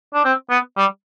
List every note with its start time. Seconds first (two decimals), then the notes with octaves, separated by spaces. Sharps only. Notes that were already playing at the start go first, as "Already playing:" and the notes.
0.14 D4
0.25 C4
0.50 B3
0.77 G3